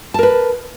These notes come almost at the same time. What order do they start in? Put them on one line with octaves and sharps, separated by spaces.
A5 A#4 B4